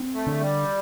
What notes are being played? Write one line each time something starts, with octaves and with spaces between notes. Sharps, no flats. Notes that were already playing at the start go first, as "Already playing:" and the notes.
Already playing: C4
A3
D3
G3